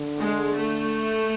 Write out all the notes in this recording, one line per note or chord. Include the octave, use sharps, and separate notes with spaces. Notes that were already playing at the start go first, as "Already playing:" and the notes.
Already playing: D3
G#3
A3